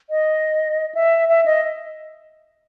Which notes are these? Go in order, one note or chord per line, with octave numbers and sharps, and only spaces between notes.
D#5
E5
E5
D#5